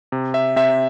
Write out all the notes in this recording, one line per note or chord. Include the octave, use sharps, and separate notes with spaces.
C3
E5
C3 E5